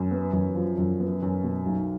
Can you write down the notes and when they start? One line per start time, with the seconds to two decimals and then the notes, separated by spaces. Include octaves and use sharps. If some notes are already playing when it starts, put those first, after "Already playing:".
Already playing: F#2
0.11 B3
0.33 F#2
0.55 F3
0.78 F#2
1.00 B3
1.22 F#2
1.43 B2
1.66 B1